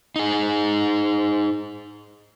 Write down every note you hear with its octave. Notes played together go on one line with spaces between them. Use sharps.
D#4 G#4